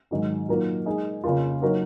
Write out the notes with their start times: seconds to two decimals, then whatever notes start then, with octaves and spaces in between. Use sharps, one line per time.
0.11 G#2 D#3 F#3
0.48 A#2 F#3 A#3 D#4 A#4
0.86 G#3 D#4 G#4 D#5
1.24 F2 C#3 F3 A#3 F4
1.62 F#3 A#3 D#4 A#4 C#5